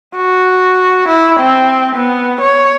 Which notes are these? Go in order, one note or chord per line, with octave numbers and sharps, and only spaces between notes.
F#4
E4
C4
B3
C#5